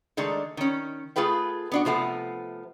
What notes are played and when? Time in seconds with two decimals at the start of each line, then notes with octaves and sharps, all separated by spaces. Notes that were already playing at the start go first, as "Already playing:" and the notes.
0.17 D#3 G#3 A3 D4 D#4
0.57 D#3 C#4
1.16 A3 F4 G#4 B4 G5
1.72 B3 D4 F#4
1.85 C3 F3 A3 B3